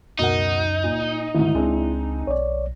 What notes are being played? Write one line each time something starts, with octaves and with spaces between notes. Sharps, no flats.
C#2 F#2 B2 D#4 A#4 F#5
A#2
D2 G#2 D#3 E4
C#2 G#3 C4 D4
B1 C#5 D5